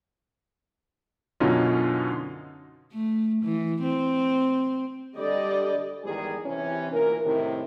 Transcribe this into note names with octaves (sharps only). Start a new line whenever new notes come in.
F#2 B2 D3 C#4 D#4 F4
A3
E3
C4
D3 G3 G4 D5 D#5
E2 G#2 D#3 G3 G#4
C3 E3 C#4
D2 A#2 E3 A#3 A#4
A2 C3 D#3